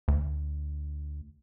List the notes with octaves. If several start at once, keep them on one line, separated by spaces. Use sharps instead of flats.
D2